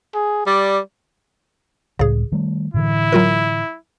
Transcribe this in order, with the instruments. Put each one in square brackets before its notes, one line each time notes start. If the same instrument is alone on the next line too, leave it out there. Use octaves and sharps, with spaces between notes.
[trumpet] G#4
[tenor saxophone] G3 [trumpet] D5
[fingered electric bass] C#2 A2 G3 [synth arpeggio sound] C#3 G#4
[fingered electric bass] D#3 G3 A3
[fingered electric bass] A2 D3 E3 [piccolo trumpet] E4
[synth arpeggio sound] F#3 F4 A#4